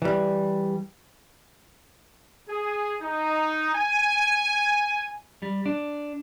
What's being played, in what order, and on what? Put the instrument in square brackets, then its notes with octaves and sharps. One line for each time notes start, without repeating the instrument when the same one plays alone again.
[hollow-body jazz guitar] E3 G3
[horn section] G#4
D#4
G#5
[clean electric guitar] G3
D4